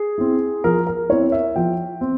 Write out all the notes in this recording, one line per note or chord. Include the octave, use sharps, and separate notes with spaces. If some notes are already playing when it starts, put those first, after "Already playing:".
Already playing: G#4
C4 E4
F3 A#4
A#4
C4 E4 C#5
E5
F3 G5
C4